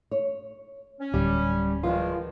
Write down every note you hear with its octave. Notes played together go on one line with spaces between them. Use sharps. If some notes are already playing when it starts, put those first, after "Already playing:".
C#5
C#4
D1 G3 G4
E2 D#3 F3 G#3 F4